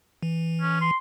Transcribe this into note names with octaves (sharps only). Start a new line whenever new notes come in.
E3
C#4
C6